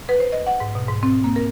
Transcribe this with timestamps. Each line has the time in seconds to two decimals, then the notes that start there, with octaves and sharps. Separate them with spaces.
0.09 B4
0.20 C5
0.32 D#5
0.46 F#5
0.60 G#2
0.75 B2
0.89 G#2
1.03 C4
1.24 A#3
1.36 A#4